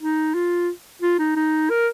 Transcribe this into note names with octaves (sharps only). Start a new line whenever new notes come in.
D#4
F4
F4
D#4
D#4
A#4